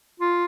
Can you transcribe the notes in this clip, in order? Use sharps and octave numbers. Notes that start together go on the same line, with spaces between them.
F4